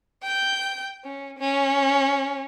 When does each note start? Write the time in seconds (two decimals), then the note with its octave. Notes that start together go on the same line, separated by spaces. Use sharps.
0.23 G5 G6
1.04 C#4
1.39 C#4